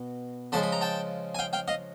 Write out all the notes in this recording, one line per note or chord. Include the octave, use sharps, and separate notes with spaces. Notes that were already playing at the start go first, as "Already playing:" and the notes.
Already playing: B2
C#3 F3 G#3 A5 B5
B5
A#5
G5 A5
G#5
F5 G5
F5 G5
D#5 F5